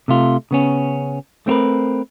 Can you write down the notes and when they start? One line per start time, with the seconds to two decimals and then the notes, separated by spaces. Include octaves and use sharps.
0.08 C3 A3 F4
0.51 C#3 B3 C#4
1.47 A3 C4 E4 A#4 B4